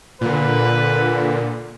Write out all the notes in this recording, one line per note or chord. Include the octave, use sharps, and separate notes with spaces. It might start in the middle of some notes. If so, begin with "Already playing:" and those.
A#2 D3 B4